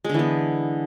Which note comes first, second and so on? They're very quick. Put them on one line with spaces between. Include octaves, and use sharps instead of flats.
G#3 D3 E3 B3